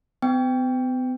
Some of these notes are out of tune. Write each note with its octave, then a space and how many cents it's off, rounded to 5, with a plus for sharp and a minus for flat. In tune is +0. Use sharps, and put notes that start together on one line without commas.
B3 +45 G5 +5